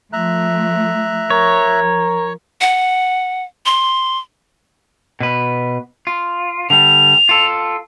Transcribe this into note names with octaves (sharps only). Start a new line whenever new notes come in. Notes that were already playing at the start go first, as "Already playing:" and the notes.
F3 A3 E5 A#5 F#6
F3 A#4 C#5
F#5
C6
B2 B4
F4
D3 G3 F7
F4 A4